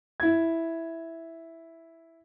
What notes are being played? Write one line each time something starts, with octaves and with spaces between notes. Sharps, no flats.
E4 G#6